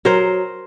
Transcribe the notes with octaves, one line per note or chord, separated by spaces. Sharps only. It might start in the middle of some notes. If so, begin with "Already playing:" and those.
F#3 A#4 C5